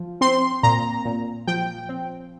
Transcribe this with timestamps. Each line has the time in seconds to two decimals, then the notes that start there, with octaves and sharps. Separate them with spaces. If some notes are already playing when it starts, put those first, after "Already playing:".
Already playing: F3
0.21 C4 C6
0.63 A#2 A#5
1.05 A#2
1.47 F3 G5
1.89 C4